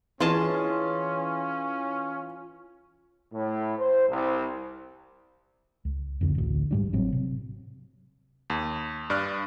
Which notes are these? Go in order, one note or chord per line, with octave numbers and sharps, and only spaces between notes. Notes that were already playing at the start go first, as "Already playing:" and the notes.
E3 C#4 F4 G#4 D#5 A5
A2
C5
C2
C#2
F2 D3
A1 D2
G#2 G3 D4
G#1 A2 F#3 C4
C3
D#2
G2 D5 F6 F#6